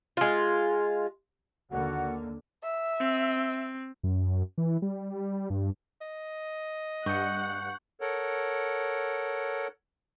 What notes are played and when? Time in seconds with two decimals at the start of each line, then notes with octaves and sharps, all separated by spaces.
0.17 G#3 F4
1.70 D#2 D3 A#3 F#4 F#5
2.63 E5
3.00 C4
4.03 F#2
4.58 E3
4.82 G3
5.50 G2
6.01 D#5
7.06 G2 F#5 C#6 G6 C#7
8.01 A4 A#4 C#5 F#5